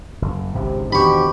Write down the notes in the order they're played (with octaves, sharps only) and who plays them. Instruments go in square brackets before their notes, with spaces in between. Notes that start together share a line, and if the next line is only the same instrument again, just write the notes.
[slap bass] F#1
[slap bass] G#1 C#2 G#2 [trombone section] C3
[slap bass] E2 D#3 D4 [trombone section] B2 C4 G4 [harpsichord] B5 C#6